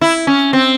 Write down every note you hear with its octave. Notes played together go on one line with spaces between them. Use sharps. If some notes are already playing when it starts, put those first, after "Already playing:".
E4
C#4
C4